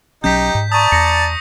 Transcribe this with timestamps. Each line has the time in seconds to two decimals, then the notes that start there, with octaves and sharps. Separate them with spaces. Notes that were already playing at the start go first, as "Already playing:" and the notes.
0.24 B1 F#3 C#4 D#4 G4 G6 B6
0.55 G#2
0.72 D5 A5 A#5 C#6 D#6
0.92 E2 A#6 C#7